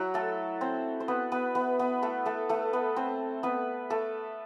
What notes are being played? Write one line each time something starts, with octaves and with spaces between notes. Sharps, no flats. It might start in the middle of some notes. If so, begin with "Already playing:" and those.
Already playing: F#3 E4 F#4
A3 A4
C4 C5
C5
B3 B4
B3 B4
B3 B4
B3 B4
A3 A4
A3 A4
A3 A4
B3 B4
C4 C5
B3 B4
A3 A4